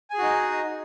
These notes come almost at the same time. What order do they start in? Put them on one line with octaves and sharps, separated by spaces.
G#5 G#4 F#4 D#4